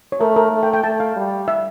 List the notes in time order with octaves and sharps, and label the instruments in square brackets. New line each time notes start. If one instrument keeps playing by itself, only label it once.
[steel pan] C#5
[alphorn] A3 [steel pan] A#4
[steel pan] A#4
[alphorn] A3
[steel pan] G5
G5
[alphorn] A3 [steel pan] A5
[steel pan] F5
[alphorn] G3
[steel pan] E5